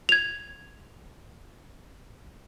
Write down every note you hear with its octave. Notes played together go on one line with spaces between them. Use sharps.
G#6 F7